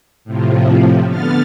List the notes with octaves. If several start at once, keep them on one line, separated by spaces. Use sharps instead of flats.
A2 C3 F3
D3 B3 F6 A6